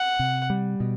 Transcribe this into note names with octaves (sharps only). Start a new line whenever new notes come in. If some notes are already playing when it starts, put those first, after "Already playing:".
Already playing: F#5
C3
G3
B2